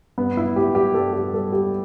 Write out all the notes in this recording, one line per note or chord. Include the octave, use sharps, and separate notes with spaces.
G2 B3
E4
G3 G4
G4
G2 A4
G4
G3 A4
G4